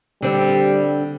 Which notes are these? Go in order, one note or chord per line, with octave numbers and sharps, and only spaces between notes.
D3 G3 C4